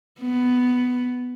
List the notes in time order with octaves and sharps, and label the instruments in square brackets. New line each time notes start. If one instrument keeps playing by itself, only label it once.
[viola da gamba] B3